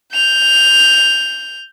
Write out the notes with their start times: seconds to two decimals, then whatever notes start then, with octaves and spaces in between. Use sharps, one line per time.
0.14 G6 F7